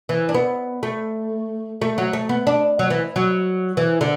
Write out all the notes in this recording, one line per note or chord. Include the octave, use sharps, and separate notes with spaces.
E3
D4
B3
A3
A3
F#3
A3
B3
D4
F#3
E3
F#3
E3
D3